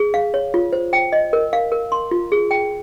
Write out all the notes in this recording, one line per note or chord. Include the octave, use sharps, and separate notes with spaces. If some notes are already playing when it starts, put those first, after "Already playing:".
Already playing: G#4
F5
C#5
F4
C5
G5
D#5
A#4
F5
A#4
C6
F4
G#4
G5